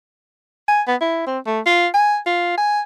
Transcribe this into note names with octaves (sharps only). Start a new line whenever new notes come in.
G#5
B3
E4
C4
A3
F4
G#5
F4
G#5